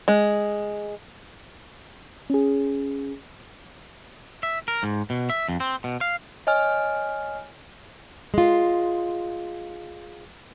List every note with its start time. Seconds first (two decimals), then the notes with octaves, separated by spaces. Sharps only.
0.08 G#3
2.30 C#4 G#4
4.43 E5
4.68 A#4
4.83 G#2
5.10 B2
5.30 E5
5.48 F2
5.60 C4
5.84 B2
6.01 F5
6.47 C#5 D#5 G#5 F6
8.34 G#3 F4